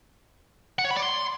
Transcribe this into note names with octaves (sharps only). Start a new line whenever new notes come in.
F#5
C#5
B5
D5
C6